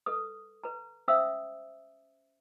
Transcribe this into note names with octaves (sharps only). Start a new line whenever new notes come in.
A4 B4 D#6
B4 A#5
C#4 C5 E5 F5 D#6 E6